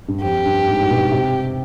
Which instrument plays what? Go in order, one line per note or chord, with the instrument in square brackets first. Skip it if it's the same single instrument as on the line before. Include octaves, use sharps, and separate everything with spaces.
[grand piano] G2
[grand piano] F2 [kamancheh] G4
[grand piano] G2
G#2
G#2
B2
C3